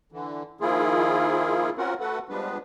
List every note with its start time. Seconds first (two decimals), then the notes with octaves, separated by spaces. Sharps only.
0.12 D3 E3
0.61 D#3 F3 A#3 E4 F4 G#4
1.78 C4 C#4 F4 F#4 A#4 F#5
2.00 A3 F#4 A4 B4 F#5
2.29 F3 G3 G#3 B3 D4 B4